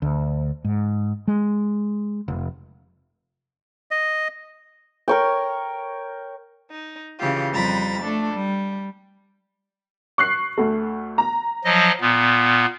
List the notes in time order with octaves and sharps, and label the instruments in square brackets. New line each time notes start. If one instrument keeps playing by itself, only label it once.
[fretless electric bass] D2
G#2
G#3
F1
[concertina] D#5
[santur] A#4 C#5 G5
[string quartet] D#4
C#3 E3 F4 G4
F2 G3 A#5 B5 A6
A3 D4 A4
G3
[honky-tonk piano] C#6 F#6 C7
D2 A3
A#5
[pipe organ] F3 F#3 D#5
A#2 B3